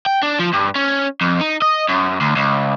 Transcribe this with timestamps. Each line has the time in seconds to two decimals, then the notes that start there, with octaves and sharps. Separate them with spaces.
0.06 G5
0.23 D4
0.40 F3
0.54 G2
0.76 C#4
1.21 F2
1.41 D#4
1.62 D#5
1.89 F#2
2.21 D2
2.36 C#2